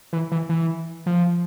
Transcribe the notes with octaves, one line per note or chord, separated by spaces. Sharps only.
E3
E3
E3
F3